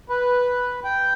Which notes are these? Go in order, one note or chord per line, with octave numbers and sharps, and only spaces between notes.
B4
G5